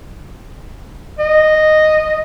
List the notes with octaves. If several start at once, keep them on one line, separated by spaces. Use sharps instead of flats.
D#5